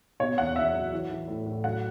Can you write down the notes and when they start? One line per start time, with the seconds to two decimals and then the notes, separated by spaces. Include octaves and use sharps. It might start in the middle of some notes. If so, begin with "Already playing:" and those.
0.20 B2 C#5
0.38 E2 F#5
0.56 E2 E5
0.74 F#3
0.93 E3
1.10 E3
1.28 A2
1.46 A2
1.64 F#3 F#5